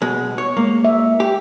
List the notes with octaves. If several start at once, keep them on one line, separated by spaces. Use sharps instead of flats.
B2 G#3
C#5
G#3 A#3
E5
G4